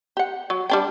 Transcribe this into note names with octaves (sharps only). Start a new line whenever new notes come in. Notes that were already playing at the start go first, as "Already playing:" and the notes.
G4 F#5
F#3
G3 D4 G5